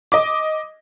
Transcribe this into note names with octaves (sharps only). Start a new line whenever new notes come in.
D#5 D6